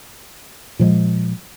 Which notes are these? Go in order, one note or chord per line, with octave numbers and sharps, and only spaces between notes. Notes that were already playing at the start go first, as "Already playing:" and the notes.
A#2 F3 F#3 G#3